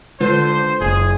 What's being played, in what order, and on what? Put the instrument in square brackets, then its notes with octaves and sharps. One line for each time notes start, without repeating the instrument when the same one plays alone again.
[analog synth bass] D3 [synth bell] G#3 F4 B4 [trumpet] C5
[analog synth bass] F#1 [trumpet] G#4